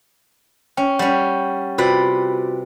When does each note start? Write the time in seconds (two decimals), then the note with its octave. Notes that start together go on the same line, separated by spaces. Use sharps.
0.77 C#4 G5
0.99 G3 C#4 F#5
1.78 C3 F4 F#4 B4 D5 G5